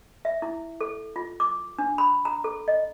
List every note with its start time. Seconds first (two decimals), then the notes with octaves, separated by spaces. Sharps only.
0.25 E5
0.42 E4
0.81 A4
1.16 F4
1.40 D6
1.79 D4
1.98 B5
2.25 A#5
2.44 A4
2.68 D#5